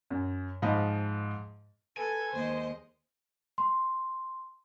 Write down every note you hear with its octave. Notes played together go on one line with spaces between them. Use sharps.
F#2
G#2 F3 D#5 F5 B5
A4 B4 G#5
D#2 G#3 C5 D#5
C6